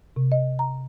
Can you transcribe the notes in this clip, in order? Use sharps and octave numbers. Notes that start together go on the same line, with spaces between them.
C3
D#5
A#5